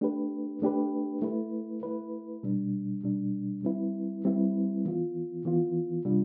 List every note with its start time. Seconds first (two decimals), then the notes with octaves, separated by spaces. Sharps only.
0.01 A3 D4 G4 B4
0.62 A3 D4 G4 B4
1.22 A3 E4 B4
1.83 A3 E4 B4
2.43 B2 G3 D4
3.04 B2 G3 D4
3.63 G3 C4 E4 B4
4.25 G3 C4 E4 B4
4.85 E3 B3 F4
5.45 E3 B3 F4
6.05 C3 G3 D4 F4